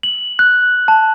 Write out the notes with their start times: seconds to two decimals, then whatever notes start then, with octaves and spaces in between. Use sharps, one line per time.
0.03 F#7
0.39 F#6
0.88 A5